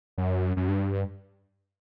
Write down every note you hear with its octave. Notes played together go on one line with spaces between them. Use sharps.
F#2
F#2
G2